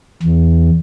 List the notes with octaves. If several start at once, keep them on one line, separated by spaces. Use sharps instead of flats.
E2